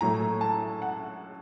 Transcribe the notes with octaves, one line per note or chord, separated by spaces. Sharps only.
A2 F#3 A3 A#5
A5
F#5